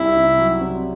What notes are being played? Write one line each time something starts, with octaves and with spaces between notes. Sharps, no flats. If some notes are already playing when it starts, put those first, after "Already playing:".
Already playing: C2 E4
C3
F#3
C4